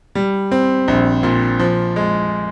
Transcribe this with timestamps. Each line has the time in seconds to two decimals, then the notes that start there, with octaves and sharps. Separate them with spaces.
0.15 G3
0.51 C4
0.88 A#1
1.23 A#2
1.59 F3
1.96 G#3